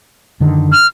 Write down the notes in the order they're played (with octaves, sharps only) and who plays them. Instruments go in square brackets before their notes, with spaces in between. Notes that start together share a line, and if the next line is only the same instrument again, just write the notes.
[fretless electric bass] F#2 D3 D#3
[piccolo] F6